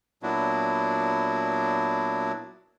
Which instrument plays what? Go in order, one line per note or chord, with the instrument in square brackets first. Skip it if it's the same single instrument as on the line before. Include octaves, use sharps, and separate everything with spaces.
[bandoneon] A#2 F#3 B3 D4 E4 F#4